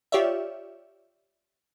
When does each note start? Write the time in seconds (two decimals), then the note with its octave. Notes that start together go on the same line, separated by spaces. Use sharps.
0.12 F4 G4 C#5 D5 E5